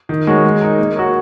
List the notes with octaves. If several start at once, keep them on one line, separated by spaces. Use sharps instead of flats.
D#3
G#3 F#4 A#4 C#5
G#3
D#4 A#4
A#3
F#4 A#4 C#5